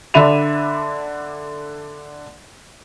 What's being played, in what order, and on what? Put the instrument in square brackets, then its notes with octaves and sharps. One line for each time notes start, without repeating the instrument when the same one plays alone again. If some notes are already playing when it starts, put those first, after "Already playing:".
[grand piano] D3 D4 E5 B5 D#7 F7